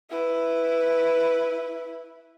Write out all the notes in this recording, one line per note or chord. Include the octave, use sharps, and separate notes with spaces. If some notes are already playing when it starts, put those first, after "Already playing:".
E4 B4